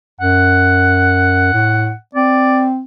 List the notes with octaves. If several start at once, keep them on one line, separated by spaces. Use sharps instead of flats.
F#2 F#5
A2
C4 D5